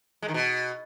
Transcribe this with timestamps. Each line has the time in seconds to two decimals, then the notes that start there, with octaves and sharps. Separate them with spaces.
0.22 G#3
0.28 D#3
0.34 B2